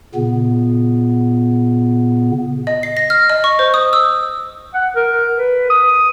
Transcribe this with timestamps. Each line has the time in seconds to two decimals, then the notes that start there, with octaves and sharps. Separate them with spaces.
0.15 A#2 C#3 B3
2.67 D#5
2.83 C7
2.97 A#6
3.10 F6
3.30 D#5
3.44 C#6
3.59 C5
3.74 D#6
3.93 E6
4.74 F#5
4.95 A#4
5.37 B4
5.70 D#6